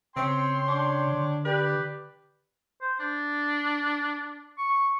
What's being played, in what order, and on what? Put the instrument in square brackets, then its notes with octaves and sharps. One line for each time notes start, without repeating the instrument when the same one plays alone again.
[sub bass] C#3 [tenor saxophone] C4 [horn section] C#5 G5 C6
[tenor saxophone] D4
[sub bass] D3
[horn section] G4 D5 [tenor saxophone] B4
[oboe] C5
D4
C#6